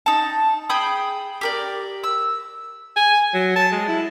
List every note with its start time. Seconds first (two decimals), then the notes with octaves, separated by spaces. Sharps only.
0.06 D#4 A5
0.69 G#4 G5 B5 D#6
1.41 G4 A#4 D5
2.04 E6
2.96 G#5
3.34 F#3
3.56 A5
3.72 G#3
3.88 E4